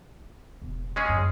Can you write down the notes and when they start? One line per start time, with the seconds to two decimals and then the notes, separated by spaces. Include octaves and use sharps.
0.62 E1
0.96 G#3 C#4 G#4
1.09 F#2